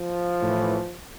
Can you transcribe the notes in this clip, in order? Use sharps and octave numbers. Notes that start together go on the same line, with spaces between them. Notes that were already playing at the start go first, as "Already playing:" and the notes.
Already playing: F3
A2 E3